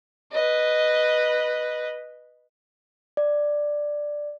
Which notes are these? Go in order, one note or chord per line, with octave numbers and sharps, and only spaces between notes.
B4 D#5
D5